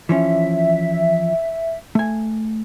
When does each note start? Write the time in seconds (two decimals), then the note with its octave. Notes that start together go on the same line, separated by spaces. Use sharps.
0.09 E3 F3 C#4 E5
1.95 A3 G#5